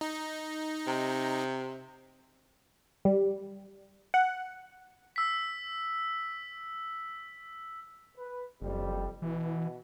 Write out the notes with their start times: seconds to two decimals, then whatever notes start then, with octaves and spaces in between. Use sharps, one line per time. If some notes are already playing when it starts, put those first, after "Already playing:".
0.01 D#4
0.87 C3
3.05 G3
4.14 F#5
5.16 E6 B6
8.17 B4
8.61 F#1 F2 G3
9.22 B2 E3